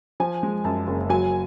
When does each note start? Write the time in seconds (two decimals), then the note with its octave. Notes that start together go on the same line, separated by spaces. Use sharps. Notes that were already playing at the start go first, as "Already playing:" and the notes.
0.20 F3 G#5
0.43 G#3
0.64 F#2 A5
0.87 F#1
1.10 F#3 G#5